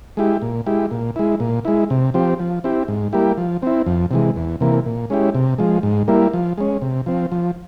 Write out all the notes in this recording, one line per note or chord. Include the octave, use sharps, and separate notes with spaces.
G#3 E4 G4
A#2
G#3 E4 G4
A#2
G#3 E4
A#2
G#3 E4
C3
F3 C4 G4
F3
C4 E4 G4
G#2
G3 A#3 E4 G4
F3
C4 E4
F2
C3 E3 G#3
E2
C3 E3 A#3
A#2
G#3 C#4 E4 G4
C3
F3 G#3
G#2
G3 A#3 E4
F3
G#3 C#4
C3
F3 C4
F3